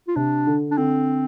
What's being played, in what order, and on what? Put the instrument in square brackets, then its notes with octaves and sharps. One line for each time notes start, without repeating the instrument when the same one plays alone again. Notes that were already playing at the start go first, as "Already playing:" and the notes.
[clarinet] F4
[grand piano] C3 [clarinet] D4
[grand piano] D3
[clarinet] D4
[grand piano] D3 [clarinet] C4